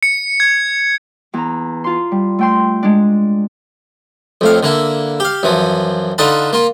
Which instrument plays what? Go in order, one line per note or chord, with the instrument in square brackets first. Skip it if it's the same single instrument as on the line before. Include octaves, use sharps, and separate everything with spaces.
[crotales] C#7
G#6
[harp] E2 A#5
F4 C6
G3
A3 G5 C6
G#3 D4
[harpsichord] F2 A2 F5
D3 A#3 E4
G4 F5
F#2 E3 F3
D3 D#4 F4 F#5 A5 B5
A#3 F4